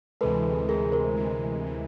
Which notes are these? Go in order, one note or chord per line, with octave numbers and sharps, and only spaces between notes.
D2 C3 E3 G#3 A4 B4
D2 C3 E3 G#3 G#4 A#4
A#4 C5
D2 C3 E3 G#3
C3 E3 G#3